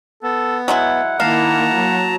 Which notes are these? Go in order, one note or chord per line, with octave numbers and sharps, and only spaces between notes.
B3 A4
F#3 G#3 E4 F#5
D#3 A#3 E4 F5 A5 A#5
F#3